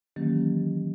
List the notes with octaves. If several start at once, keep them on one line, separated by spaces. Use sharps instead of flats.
D#3 E3 F#3 A#3 C#4 G4